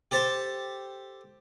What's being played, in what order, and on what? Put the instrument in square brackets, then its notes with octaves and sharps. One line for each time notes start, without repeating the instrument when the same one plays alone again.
[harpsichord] G4 A4 C5 A5